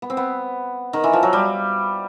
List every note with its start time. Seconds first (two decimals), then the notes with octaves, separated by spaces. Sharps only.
0.02 B3
0.10 C4
0.17 B3
0.93 D#3
1.04 E3
1.13 F3
1.23 F#3
1.33 G3